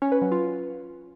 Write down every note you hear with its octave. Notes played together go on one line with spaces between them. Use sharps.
C#4
B4
F#3
F4